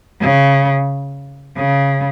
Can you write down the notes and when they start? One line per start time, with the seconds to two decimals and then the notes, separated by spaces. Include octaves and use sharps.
0.21 C#3
1.57 C#3